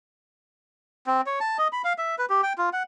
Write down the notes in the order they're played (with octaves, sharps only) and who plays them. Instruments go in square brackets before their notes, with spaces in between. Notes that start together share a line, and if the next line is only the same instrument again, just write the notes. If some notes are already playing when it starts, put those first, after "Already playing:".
[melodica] C4
C#5
A5
D#5
B5
F5
E5
B4
G4
G5
F4
F#5